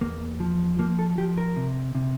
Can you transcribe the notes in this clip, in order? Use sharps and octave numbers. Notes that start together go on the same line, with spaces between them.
E2 A#3
F3
F3 A#3
A4
F3 G4
A#4
C3
C3